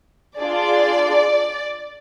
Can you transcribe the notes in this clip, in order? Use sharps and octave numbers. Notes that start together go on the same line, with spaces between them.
D4 F4 G#4 D5